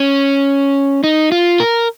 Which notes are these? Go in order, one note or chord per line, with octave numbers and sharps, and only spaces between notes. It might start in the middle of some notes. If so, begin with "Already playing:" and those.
Already playing: C#4
D#4
F4
A#4